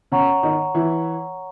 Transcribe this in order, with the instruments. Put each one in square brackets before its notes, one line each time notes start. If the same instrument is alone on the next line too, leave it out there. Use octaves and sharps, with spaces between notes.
[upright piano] C#3 C#4 [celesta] C#5 F#5 A#5 C#6
[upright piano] D#3 D#4
E3 E4